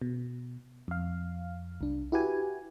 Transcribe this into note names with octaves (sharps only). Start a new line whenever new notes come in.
B2
F2 F5
C2 D4
E4 F#4 G4 B4 G#5